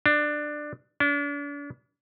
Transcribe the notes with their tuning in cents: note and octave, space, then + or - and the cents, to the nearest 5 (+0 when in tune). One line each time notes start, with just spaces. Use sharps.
D4 +15
D4 -40